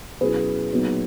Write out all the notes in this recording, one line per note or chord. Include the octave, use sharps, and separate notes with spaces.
B2 F#3 C#4 E4 G#4 B4
A#2 F#3 B3 D#4